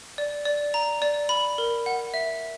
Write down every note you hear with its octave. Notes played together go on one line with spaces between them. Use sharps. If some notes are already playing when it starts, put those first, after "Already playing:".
D5
D5
A#5
D5
B5
A#4
F#5
E5